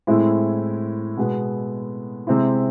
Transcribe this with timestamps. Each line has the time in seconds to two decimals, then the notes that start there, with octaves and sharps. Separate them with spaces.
0.07 A2 G#3 C4 E4
1.17 B2 G#3 B3
2.27 C3 G#3 C4 E4